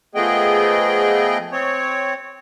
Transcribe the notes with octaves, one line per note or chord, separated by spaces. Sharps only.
F3 A3 B3 G#4 D#5 G5
C4 C#5